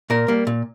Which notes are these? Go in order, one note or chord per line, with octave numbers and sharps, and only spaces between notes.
A#2 A#4
G3 A#3
A#2